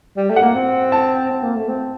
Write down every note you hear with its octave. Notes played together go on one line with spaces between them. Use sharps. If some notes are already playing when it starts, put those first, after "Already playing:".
G3
A3
F#5
A#3
C4
A5
C4
A#3
A3
C4